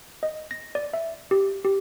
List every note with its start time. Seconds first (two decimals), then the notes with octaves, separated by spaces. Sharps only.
0.23 D#5
0.51 A#6
0.75 D5
0.94 E5
1.31 G4
1.65 G4